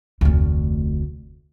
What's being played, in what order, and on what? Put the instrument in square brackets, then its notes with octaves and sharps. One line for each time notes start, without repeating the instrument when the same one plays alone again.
[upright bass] F1 D2